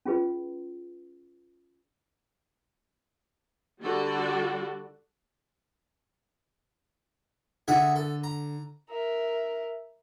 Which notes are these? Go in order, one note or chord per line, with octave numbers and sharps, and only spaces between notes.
C#4 F4 G#4 B4
D3 G3 F#4 A4 D5
D3 G#4 E5 F#5
A4
A#5
A#4 E5